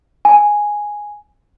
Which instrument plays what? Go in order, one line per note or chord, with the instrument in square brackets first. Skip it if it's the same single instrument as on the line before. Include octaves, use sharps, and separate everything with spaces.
[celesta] G#5